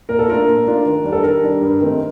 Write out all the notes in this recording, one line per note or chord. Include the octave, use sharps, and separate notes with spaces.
A#2 A#4
A4
A3 D4 F4 A#4
A#2
A3 D4 F4
D#3
G3 D4
A4
D#3 A#4
G3 D4
G2
D#3 A3 C4 D#4